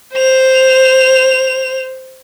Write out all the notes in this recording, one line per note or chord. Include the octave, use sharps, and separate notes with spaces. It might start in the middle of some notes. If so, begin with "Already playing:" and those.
C5 F7